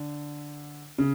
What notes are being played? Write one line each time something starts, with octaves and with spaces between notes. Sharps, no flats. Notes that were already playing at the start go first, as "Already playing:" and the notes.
Already playing: D3
C#3